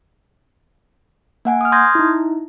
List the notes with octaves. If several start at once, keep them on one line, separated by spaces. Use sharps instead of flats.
A#3 F#5 G#5
D#6 F6
C6 D#6 F6 G6 G#6 A#6
D#4 E4